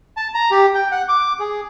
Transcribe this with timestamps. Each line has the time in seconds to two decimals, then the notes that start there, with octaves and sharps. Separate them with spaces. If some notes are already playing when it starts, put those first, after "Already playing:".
0.17 A5
0.34 A#5
0.51 G4
0.75 G5
0.92 F#5
1.08 D6
1.40 G#4